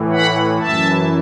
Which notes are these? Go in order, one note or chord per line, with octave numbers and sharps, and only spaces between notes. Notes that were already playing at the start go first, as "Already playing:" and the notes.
Already playing: A2 E3
F#5 B5
F#2 E3 E5 A5